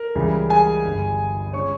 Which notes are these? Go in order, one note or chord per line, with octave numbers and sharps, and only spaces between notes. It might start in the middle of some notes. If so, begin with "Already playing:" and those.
Already playing: A#4
C#2 C#3 E3 G3
G#4 G#5
G1 G2 G3
C#3 G#3 C#5 C#6